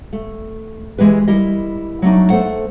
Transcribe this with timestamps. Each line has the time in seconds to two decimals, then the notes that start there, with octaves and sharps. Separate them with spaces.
0.13 A3
0.98 E3 G#3 G4 B4
1.28 G3 E4 A#4 D#5
2.02 F#3 A3 D4 D#4
2.30 A3 A4 C5 F#5